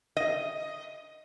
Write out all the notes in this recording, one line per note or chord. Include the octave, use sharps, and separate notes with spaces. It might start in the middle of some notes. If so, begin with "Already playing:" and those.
D#5